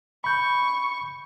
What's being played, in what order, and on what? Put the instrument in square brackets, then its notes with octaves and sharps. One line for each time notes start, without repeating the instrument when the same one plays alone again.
[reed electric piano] B5 G6 [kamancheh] C#6